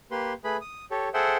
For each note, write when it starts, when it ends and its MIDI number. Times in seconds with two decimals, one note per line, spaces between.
0.11 0.33 58
0.11 0.33 67
0.11 0.33 71
0.11 0.33 84
0.44 0.57 57
0.44 0.57 68
0.44 0.57 71
0.44 0.57 83
0.61 0.85 87
0.91 1.09 67
0.91 1.09 69
0.91 1.09 73
1.14 1.37 68
1.14 1.37 69
1.14 1.37 72
1.14 1.37 76
1.14 1.37 78
1.14 1.37 79